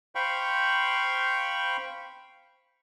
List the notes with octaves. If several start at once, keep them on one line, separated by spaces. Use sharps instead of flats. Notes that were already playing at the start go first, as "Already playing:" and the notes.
C5 F5 G5 B5 C#6